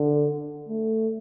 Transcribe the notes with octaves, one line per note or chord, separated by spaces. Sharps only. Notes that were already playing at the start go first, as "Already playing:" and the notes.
Already playing: D3
A3